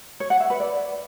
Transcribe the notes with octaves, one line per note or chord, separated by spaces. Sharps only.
C#5
F#5
E5
B4
D5